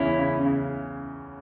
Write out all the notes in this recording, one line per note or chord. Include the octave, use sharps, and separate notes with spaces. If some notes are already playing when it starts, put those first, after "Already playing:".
Already playing: E2 C#3 C#4 E4
C#3
C#3